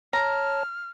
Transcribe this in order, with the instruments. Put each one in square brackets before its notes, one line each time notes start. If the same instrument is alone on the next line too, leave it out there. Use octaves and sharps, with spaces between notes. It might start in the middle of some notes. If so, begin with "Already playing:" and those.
[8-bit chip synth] C#5 A5 [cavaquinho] A#5 [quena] F6